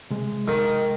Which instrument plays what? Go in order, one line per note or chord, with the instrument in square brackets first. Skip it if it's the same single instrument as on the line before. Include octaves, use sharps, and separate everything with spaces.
[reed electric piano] C3 G#3
[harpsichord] D#3